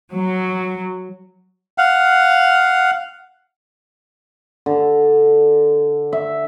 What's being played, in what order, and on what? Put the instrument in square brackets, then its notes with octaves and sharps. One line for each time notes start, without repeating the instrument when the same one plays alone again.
[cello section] F#3
[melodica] F5 F#5
[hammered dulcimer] D3
E5